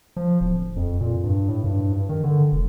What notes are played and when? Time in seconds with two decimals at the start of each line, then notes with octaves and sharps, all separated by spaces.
0.16 F3
0.40 D1
0.76 F2
1.01 A#2
1.24 G2
1.48 A2
1.64 G2
1.93 G2
2.09 D#3
2.24 D3
2.52 E1